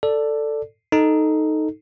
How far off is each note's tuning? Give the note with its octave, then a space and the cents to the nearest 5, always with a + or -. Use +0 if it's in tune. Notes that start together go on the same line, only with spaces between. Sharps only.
A4 +10 D5 +0
D#4 +0 A4 +0